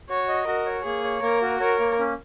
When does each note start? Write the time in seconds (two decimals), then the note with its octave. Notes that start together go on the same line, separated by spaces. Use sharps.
0.09 F#4 C#5
0.29 D#5
0.46 F#4 A#4
0.66 C#5
0.85 A#3 G#4
1.04 C#5
1.22 A#3 A#4
1.42 F#4
1.60 A#4 C#5
1.79 A#3
1.99 C#4